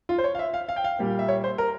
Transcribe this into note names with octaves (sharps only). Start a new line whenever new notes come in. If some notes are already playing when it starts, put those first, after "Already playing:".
F4
C5
C#5
F5
E5
F5
F5
G5
F5
A#2 G3 A#3
E5
C#5
C5
A#4